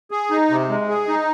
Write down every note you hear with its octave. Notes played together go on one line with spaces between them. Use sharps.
G#4
D#4
C3
G#3
G#4
D#4